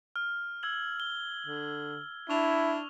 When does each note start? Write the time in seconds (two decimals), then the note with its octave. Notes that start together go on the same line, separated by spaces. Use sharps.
0.16 F6
0.63 E6 G#6 F#7
1.00 G7
1.47 D3
2.29 D4 E4 C#6 F7